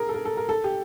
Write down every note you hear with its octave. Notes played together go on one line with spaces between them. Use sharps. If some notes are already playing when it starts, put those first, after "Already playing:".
Already playing: G#4 A#4
A4
A#4
A4
A#4
A4
G4